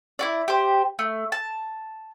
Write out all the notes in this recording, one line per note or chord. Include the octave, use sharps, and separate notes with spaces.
E4 F#4 D5
G4 C5
A3
A5